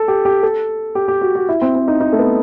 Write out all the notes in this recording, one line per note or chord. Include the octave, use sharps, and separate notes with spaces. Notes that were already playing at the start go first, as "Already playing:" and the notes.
Already playing: A4
G4
G4
A4
G4
G4
F#4
F#4
E4
C4
C4
D#4
D#4
A3
B3